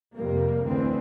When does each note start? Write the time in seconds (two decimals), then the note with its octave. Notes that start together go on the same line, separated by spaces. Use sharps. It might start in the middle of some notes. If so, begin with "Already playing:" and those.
0.15 F2 C3 G3 A#3
0.66 A1 D2 D3 E3 C4